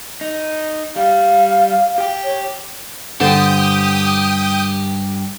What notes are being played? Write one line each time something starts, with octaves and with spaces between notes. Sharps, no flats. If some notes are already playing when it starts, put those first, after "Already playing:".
D#4
G3 G4 F5
G4 G5
C#5
G2 D3 G4 C5 G5 A5 D#6